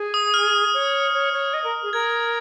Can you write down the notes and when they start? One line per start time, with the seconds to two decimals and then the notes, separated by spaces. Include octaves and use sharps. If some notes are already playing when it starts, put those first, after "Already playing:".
Already playing: G#4
0.14 D#6
0.34 F6
0.74 C#5
1.14 C#5
1.33 C#5
1.54 D#5
1.64 A#4
1.83 G#4
1.93 A#4 G#6